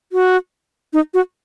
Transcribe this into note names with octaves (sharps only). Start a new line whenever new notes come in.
F#4
D#4
F#4